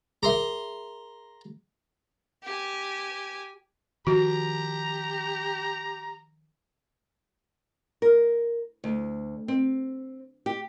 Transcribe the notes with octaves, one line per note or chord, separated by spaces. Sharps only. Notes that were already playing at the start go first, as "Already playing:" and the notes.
G#4 A#4 E5 A#5 C6
G4 G#5
D#3 F3 F#4 G4 A#5
A#4
D2
C4
G4